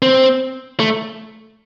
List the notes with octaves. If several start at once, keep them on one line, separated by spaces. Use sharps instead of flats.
C4
A3